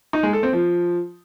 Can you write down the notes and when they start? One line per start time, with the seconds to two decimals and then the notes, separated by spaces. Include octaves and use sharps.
0.13 D#4
0.23 G#3
0.33 A4
0.43 C4
0.53 F3